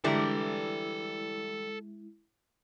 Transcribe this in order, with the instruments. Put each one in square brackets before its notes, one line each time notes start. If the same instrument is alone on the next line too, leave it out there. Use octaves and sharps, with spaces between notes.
[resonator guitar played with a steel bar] D3 E3 G3 [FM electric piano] G#3 E4 [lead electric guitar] A4 A#5